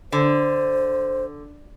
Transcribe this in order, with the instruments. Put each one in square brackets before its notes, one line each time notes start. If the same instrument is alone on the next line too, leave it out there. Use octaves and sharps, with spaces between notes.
[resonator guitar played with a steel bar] D3 [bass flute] C5